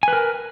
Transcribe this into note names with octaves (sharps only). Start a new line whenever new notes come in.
A#4 B4 G#5